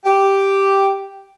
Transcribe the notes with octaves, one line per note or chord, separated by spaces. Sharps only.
G4